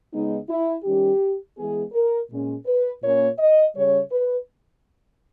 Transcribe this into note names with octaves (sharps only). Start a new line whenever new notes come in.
C#3 G#3 B3 D#4
E4
D#3 G3 C#4 G4
E3 G#3 B3 G#4
A#4
A#2 G#3 C#4
B4
A#2 A#3 C#4 C#5
D#5
C#3 G3 C#4 C#5
B4